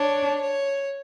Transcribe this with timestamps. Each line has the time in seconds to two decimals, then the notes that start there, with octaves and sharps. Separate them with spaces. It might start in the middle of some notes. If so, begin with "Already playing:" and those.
Already playing: D4 C#5
0.41 C#5